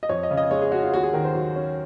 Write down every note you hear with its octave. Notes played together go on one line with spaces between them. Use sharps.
D#5
F2 C#5
D#5
C#3
D#5
G#3 C#5
G#4
C#4 F#4
F4
D#2 F#4
G#4
D#3 A#4
C5
F#3
C#4